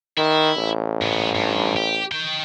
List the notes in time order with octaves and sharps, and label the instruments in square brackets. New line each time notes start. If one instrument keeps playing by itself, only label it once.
[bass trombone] D#3 [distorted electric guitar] E4
[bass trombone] A1
[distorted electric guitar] G#2 B3
G2
G4
D#4 G5